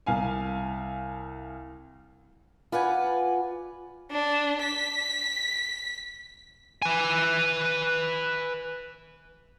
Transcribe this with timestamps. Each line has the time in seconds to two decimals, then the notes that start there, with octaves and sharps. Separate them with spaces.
0.06 C2 F5 G#5
2.72 F4 B4 D5 F#5 G#5
4.11 D4
4.62 B6
6.82 B4 G#5